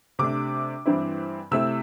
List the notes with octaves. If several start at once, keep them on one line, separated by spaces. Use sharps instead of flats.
C3 A3 D4 D6
G2 E3 C4 E4
C3 A3 C4 E4 E6